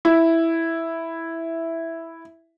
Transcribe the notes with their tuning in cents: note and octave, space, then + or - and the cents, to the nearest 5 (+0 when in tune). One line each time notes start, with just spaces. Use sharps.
E4 +0